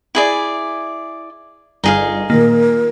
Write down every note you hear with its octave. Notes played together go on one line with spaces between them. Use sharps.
E4 G#4 D5
G1 D#4 G#4 F5
A#2 D#3 A#3 A#4